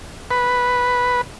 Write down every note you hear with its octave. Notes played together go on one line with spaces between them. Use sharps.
B4